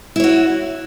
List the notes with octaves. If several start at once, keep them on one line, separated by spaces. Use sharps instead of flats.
E4 F#4 C#5